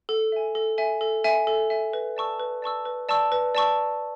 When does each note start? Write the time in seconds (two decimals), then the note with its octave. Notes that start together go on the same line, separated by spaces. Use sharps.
0.09 A4
0.32 E5 G#5
0.55 A4
0.78 E5 G#5
1.01 A4
1.24 E5 G#5
1.47 A4
1.70 E5 G#5
1.93 B4
2.17 D5 A5 C#6 E6
2.40 B4
2.62 D5 A5 C#6 E6
2.85 B4
3.09 D5 A5 C#6 E6
3.32 B4
3.55 D5 A5 C#6 E6